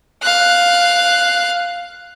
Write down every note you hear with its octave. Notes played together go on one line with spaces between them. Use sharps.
F5 F#6